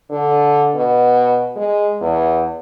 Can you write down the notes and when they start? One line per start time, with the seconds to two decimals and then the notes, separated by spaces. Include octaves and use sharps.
0.10 D3
0.75 B2
1.56 G#3
2.01 E2